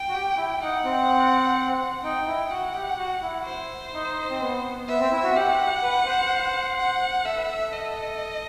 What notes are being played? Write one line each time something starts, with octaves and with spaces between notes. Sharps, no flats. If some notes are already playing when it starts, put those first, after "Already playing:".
Already playing: G5
F#4
G4
E4
D#4 F#5
C4
D#4 G5
E4
F#4 F#5
G4
F#4
E4
C5
D#4
C4
B3
B3 E5
C4
E4
F#4
G4 F#5
B4
C5
F#5
A4 E5
B4
A4
D#5